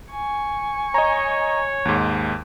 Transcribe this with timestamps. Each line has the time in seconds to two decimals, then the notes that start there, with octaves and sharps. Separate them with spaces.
0.11 G#5 C#6
0.94 C#5 D#5 A#5
1.85 D#2 G#2